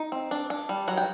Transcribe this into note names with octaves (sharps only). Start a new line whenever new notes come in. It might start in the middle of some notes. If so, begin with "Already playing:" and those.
Already playing: D#4
C4
D4
D4
G3
F#3 F#5
G5